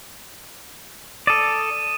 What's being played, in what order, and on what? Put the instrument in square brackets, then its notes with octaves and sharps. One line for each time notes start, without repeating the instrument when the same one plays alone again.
[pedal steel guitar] A4 D5 [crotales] D#6 D#7 E7